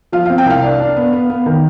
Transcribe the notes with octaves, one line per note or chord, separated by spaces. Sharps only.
F3 F5
C4 F5
G5
C2 F5
D4
D4
B3
B3
B3
D#3